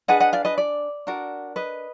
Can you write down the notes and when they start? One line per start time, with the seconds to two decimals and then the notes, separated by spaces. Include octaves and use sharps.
0.08 D4 G#4 B4 D#5 F#5
0.20 D#5 F#5
0.33 D5 F5
0.45 B4 D#5
0.58 D5
1.07 D4 F#4 A#4
1.56 B4 D#5